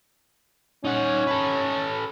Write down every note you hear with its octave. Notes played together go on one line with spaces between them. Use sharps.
C#4 D#4 F#5
A4 B4